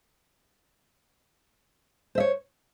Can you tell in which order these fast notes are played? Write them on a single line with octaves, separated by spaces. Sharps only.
C5 E5 C#5